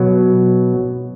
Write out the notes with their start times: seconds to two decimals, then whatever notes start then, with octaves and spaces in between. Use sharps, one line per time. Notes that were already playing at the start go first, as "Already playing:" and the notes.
Already playing: B2 F#3